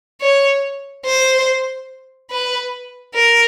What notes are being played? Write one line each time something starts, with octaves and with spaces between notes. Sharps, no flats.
C#5
C5
B4
A#4